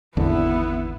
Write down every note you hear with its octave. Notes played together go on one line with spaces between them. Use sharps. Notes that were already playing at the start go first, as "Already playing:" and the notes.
G#1 E2 D3 B3 E4